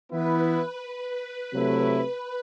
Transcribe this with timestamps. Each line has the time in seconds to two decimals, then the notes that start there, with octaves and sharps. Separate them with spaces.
0.11 E3 B3 E4 B4
0.83 B4
1.54 C3 F#3 A3 E4